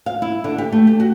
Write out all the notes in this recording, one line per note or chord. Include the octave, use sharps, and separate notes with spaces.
F5
E4
D3
G4
A3
G4
F#4